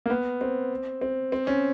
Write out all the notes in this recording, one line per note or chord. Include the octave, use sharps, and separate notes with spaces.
A#3
B3
C4
C4
C4
C#4